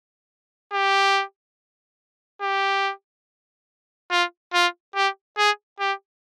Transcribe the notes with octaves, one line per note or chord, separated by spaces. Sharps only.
G4
G4
F4
F4
G4
G#4
G4